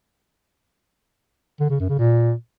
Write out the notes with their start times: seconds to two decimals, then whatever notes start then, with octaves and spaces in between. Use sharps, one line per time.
1.60 D3
1.70 C#3
1.80 F#2
1.89 C#3
1.99 A#2